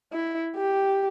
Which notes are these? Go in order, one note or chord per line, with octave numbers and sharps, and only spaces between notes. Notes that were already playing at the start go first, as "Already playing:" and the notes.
E4
G4